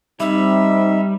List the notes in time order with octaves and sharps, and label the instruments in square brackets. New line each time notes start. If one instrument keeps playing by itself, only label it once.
[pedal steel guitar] G3 [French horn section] C4 D#4 [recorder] E5